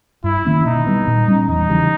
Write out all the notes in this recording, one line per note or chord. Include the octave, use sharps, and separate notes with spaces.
G2 E4
D#3 A#3 C#4
B2 D#4
G3 B3
A#2
G3 C#4
E2 D#4
C#3 E3 G3